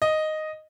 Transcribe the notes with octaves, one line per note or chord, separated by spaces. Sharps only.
D#5